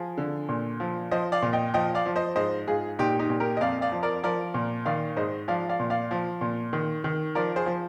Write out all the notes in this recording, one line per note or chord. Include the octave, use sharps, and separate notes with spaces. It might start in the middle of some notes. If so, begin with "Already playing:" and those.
Already playing: F3 G#4
D3
A#2
F3
F3 C5 D#5
D5 F5
A#2
D#5 G5
F3 D#5 G5
D5 F5
F3
C5 D#5
G#2 C5 D#5
G#2 F4 G#4
A#2 D#4 G4
D#4 G4
A#2
G4 A#4
D#5
F2 D5 F5
D5 F5
F3
A#4 D5
F3 A#4 D5
A#2
D#3 D5 F5
G#2 C5 D#5
F3 D5 F5
D5 F5
A#2
D5 F5
F3
A#2
D#3
D#3
F3 A#4 D5
G#4 C5
F3